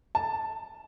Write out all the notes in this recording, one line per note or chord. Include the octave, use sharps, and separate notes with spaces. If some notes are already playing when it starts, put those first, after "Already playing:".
A5